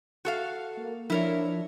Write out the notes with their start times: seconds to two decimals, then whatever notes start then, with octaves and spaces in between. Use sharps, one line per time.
0.25 F#4 A4 F5
0.77 A#3
1.10 F3 D4 E4 A#4 C#5